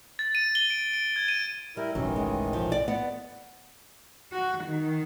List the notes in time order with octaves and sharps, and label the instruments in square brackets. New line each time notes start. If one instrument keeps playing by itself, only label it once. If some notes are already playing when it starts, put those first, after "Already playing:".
[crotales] A6
D#7
G7
D7
D7
G#6
D#7
[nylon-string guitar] G3 [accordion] E4 A#4
[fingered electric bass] F#1 B1 C#4 [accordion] A2 D#3 E3 [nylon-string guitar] F#3
[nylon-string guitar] G#3
F3
D5
B3 D5 F#5
[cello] F#4
D#3